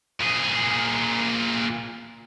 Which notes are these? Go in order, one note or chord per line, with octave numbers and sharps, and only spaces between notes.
A#2 G#4